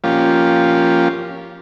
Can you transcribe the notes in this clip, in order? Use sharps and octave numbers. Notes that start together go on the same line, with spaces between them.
F3 A#3 C#4 F4 G4